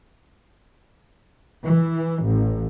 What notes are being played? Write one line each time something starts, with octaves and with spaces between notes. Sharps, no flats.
E3
A1